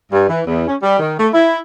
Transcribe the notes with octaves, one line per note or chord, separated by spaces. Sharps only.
G2
E3
E2
C#4
G3
D#3
A3
E4